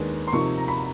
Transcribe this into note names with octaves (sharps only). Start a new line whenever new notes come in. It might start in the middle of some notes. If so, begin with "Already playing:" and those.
Already playing: D#2 D#3 G#3 B3 D4
C6
C3 F3 A#3 D#4 C#6
A#5
B5